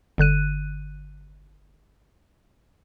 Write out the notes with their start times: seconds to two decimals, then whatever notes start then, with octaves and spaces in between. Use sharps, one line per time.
0.18 G1 D3 F#6 D#7